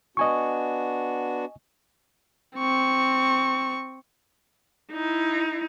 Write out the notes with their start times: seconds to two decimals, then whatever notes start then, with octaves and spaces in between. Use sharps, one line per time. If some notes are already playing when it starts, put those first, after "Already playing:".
0.17 B3 D4 F#4 D#5 G#5 C#6
2.57 C4 C#6
4.92 D#4 E4